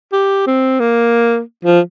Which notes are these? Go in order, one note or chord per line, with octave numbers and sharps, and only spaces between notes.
G4
C4
A#3
F3